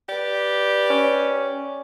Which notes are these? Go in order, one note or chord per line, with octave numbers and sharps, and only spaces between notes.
G4 B4 D5
C#4